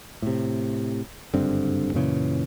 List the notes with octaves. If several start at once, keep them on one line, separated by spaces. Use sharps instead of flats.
A2 C3
F#1 G2 D3 C4
F#2 A#2 C#3 E3